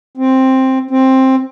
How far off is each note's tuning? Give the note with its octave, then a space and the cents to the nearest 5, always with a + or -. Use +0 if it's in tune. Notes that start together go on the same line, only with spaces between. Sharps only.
C4 +5
C4 +10